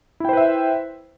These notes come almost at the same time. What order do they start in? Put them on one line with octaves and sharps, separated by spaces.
E4 G5 C5 B4 E5